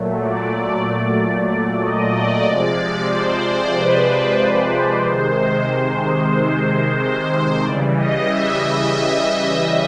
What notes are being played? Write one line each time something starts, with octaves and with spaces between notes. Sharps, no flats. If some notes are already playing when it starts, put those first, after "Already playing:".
Already playing: A#2 F#3 A3
D5
D#5
D5
C3 F3 G#3 D5
C5
B4
C3 D#3 G#3 C5
C5
C#3 E3 G3 D5
D#5
E5
D#5
E5